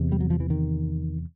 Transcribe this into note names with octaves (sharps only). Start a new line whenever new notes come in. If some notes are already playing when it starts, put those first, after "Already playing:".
Already playing: E2 C3
G3
F#3
F3
E3
D#3